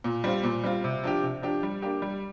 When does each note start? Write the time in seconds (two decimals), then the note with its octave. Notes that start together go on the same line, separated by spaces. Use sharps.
0.04 A#2
0.24 G3 C4 F4
0.44 A#2
0.64 G3 C4 F4
0.84 C3
1.04 F3 D4 G4
1.23 C3
1.42 F3 D4 G4
1.63 G3
1.82 A#3 D4 G4
2.02 G3